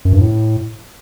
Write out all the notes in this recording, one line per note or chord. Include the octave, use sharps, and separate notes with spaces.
F#2
G2
A2